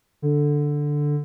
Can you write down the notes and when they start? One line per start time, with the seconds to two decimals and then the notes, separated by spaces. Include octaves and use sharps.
0.22 D3